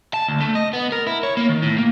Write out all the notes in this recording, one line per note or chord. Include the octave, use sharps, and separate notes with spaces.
A5
D2
A3
D#5
B3
A#4
E4
C#5
A#3
D#3
A2
A#3